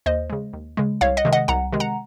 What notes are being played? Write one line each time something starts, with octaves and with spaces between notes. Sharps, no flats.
D#2 C5 D#5
C#3 G#3
D#2
C#3 G#3
C2 C#5 F5
D#5 F#5
C3 D#3 G#3
D#5 F#5
C2 F#5 A#5
C3 D#3 G#3
F#5 A#5